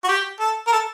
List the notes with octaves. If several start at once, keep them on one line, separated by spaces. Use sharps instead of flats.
F#4
G4
A4
A#4
A4